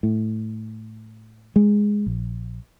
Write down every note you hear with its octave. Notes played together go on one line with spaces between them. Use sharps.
A2
G#3
A#1